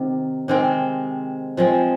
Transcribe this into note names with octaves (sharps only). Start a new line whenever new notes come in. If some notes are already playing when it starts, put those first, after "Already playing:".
Already playing: C3 D#3
C3 D#3 G#3 C4
F3 G#3 C4